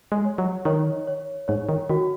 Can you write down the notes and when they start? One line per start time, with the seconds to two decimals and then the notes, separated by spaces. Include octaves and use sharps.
0.12 G#3
0.25 C#5
0.38 F#3
0.65 D#3 C#5
1.07 C#5
1.48 G#2 C#5
1.69 D#3
1.90 D#3 F#4